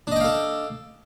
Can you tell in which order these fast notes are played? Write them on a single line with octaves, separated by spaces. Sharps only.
D4 D#5 G5 F5 A4